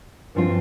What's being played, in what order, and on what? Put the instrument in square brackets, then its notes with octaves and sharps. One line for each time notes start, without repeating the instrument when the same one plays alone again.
[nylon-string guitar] G2 F3 C4 F4